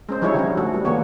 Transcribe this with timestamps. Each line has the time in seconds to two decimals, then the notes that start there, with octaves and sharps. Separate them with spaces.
0.09 G#3 C#4 C5
0.22 F3 G3 D#4 E4 G#4 C#5
0.34 D3 F#3 G#3 C#4
0.57 D3 F3 A3 F#4
0.74 G3
0.85 D3 E3 A#3 B3 C#5